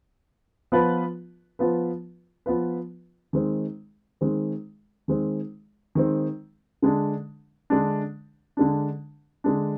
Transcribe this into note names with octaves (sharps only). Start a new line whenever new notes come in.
F3 B3 F4 B4
F3 B3 F4 B4
F3 B3 F4 B4
D#3 G#3 C4
D#3 G#3 C4
D#3 G#3 C4
D#3 G#3 C4
D3 G#3 D4
D3 G#3 D4
D3 G#3 D4
D3 G#3 D4